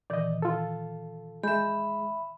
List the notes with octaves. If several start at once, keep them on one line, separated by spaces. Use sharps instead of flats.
A#2 D#3 E3 D5 D#5
F4 A4
G#3 E5 B5 G6